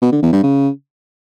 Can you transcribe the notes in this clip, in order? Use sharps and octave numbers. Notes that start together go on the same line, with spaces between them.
B2
D3
E2
G2
C#3